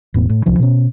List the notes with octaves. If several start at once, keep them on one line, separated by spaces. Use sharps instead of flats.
E1 A2 B3
A2
D1 C2 F3 D4
B2 C#4